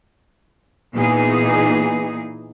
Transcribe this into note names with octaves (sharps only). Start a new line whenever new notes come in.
A#2 E3 B3 D#4 G#4